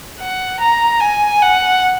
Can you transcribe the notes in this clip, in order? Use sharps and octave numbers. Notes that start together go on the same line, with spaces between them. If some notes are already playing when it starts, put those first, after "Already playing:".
F#5
A#5
G#5
F#5